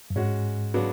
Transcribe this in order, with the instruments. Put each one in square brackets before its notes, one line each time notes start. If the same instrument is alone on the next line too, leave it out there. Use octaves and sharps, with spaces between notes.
[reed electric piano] F#2
[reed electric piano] G#2 [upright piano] G#3 C#4 F#4
[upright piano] C#3 F#3 B3 D4 F#4